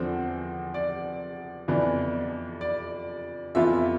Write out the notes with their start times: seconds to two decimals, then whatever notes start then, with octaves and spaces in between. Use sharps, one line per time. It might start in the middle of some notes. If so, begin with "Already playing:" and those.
Already playing: E2 D3 F3 C4 C5
0.74 D5
1.68 F2 E3 B3 D4
2.61 D5
3.55 F2 E3 B3 F4 E5